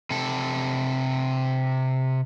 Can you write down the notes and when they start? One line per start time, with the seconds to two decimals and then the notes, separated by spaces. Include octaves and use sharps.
0.10 C3 A4